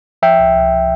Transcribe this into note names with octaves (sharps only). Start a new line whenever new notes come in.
F3 E5 G5
C2
C2